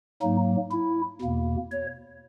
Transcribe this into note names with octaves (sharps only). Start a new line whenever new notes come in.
G#2 F#3 A#3 D#4
E4
E2 B2 A#3
C#5